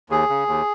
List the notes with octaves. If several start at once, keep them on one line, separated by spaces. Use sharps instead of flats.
D#2 G#4
C#3
D#2